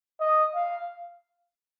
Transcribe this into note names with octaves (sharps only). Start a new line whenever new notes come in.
D#5
F5